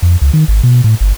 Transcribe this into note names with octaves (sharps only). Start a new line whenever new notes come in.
F2
C#2
D#3
G#1
B2
A2
G1